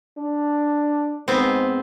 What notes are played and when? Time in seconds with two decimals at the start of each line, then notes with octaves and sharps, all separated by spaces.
0.18 D4
1.28 G#2 B3 C4